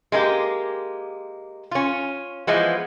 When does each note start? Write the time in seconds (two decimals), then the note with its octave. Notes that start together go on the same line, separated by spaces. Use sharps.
0.12 G#3 A#3 E4 G4
1.71 C#4 F4
2.47 E3 F3 G#3 B3